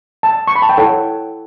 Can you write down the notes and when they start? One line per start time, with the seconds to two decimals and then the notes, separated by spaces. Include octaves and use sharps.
0.23 A5
0.47 C#6
0.56 B5
0.62 A5
0.69 G5
0.77 E4 A4 C#5 F#5